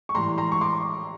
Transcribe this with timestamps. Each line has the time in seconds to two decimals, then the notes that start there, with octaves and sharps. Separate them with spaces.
0.09 C#6
0.15 A2 E3 G3 A#5 C6
0.38 A#5 C6
0.52 C#6
0.61 C6 D6